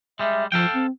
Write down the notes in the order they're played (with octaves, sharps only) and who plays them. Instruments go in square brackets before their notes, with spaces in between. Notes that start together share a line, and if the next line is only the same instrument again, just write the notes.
[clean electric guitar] G3 G#3 [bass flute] E5
[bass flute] F3 [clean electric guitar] A4 F5 G5
[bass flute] C4